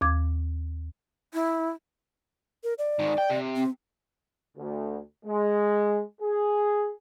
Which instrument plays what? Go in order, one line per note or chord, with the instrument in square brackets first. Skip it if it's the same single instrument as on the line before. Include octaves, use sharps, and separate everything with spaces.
[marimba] D#2 D6 G#6
[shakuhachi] E4
[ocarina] A#4
D5
[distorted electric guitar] G#2 D#3
G5
C3
[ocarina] C4
[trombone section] D2
G#3
G#4